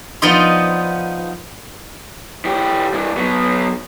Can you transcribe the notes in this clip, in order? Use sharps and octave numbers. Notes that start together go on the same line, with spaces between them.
F3 B3 D#4 D5 D#5 C6
E3 G4
G2 E3
F#3 B3